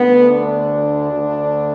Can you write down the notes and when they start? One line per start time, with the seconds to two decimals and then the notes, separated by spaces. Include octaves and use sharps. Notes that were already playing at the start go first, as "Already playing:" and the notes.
Already playing: D2 D3 A3 B3
0.29 D4
1.12 D2 D3 A3